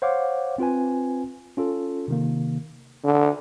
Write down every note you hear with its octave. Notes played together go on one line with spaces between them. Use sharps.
C5 C#5 F5 F#5 D6
C4 F4 B4 G#5
C#4 F4 A4
C3 D#3 A#3
D3